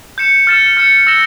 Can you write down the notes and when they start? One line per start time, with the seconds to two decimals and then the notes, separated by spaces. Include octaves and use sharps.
0.18 G6 C#7 E7
0.47 F6 A6 C#7 E7
0.77 F6 A6 C#7 E7
1.07 E6 A#6 E7 G7